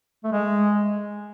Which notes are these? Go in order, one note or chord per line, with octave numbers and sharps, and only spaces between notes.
A3
G#3